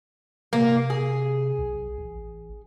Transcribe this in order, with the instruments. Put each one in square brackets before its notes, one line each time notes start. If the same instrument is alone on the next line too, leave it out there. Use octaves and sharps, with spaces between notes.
[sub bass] C3 [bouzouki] A#3
[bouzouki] G#4
[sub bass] B1
A1